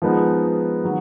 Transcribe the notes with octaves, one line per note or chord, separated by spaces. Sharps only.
F3 G#3 B3 D#4
D#3 F#3